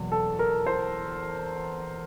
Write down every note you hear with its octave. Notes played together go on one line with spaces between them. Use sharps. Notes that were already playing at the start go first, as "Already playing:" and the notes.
Already playing: E2 B2 F#3 A#3
A4
A#4
C5